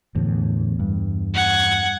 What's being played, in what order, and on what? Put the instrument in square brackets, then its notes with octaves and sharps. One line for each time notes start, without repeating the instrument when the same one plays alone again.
[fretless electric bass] E2 [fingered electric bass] A2 D3
[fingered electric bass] G2
[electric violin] F#5 G#6